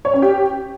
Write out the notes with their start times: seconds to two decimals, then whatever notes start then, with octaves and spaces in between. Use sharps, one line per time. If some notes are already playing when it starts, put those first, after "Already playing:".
0.05 C#5
0.14 C#4
0.22 G4